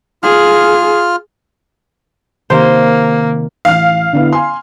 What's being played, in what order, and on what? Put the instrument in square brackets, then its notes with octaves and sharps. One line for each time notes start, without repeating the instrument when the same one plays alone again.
[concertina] F4 F6 [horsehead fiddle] G#4
[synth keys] C3 D#3 [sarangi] A#3 [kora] C5
[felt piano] A1 F6 [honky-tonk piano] F5
[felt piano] D3 B3 E4
G#5 C6